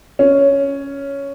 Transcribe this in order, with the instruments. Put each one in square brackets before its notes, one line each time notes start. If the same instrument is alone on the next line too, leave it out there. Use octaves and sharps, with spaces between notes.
[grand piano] C#4